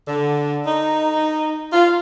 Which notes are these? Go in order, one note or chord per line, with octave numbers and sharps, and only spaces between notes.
D3
D#4
F4